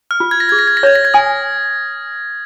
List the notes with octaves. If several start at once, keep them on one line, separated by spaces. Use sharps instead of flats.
F6
F4
G#6
A#6
G#4 G#6
A#6
G#6
A#6
C#5 G#6
A#6
G#6
G#5 D#6